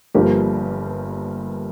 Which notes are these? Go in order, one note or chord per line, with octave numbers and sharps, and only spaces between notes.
G1 G2 F3 A#3 G4